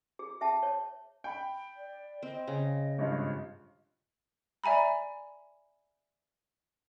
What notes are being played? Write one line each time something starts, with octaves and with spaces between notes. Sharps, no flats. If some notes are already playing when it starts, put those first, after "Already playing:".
G#4
G#4 E5 G5 A5
C#5
G5 B5
D5
C4 D#5
C#3
G#1 G2 F4
D5 E5 G#5 A#5 B5